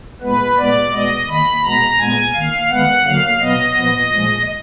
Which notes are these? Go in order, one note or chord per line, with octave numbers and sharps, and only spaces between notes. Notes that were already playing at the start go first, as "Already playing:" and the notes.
A#2 G#3 B3 B4
A#2 G#3 B3 D5
B2 G#3 B3 D#5
D#3 A#3 B5
B2 G#3 B3 A#5
A#2 G#3 B3 G#5
D#3 A#3 F5
D#3 G#3 B3 F#5
D3 F#3 A#3 F5
B2 F#3 B3 D#5
A#2 F3 B3
A#2 F3 G#3